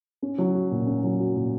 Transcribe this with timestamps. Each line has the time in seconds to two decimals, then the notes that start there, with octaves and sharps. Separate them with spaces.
0.22 C#4
0.38 F#3
0.55 F#4
0.71 A#2
0.87 C#4
1.03 F#3
1.20 F#4
1.35 A#2